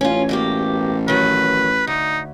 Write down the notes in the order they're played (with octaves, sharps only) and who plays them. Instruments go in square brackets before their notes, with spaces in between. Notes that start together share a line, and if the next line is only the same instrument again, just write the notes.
[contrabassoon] A1 [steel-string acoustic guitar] C#4 F4
[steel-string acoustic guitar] B2 A#3 G4
[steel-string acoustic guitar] D#3 F#3 [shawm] B4
[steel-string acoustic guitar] D2 [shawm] D#4